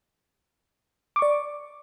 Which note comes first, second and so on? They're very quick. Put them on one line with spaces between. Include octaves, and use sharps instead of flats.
D6 C#6 D5